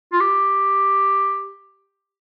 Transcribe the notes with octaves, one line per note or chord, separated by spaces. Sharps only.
F4
G4